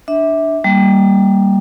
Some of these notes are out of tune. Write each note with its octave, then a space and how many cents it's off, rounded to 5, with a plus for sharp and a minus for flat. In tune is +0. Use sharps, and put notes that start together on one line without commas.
D4 +0 E5 -20
G3 +0 A#3 +0